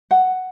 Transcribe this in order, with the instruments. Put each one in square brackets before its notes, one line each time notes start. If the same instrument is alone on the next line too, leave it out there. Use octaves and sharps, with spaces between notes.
[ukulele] F#5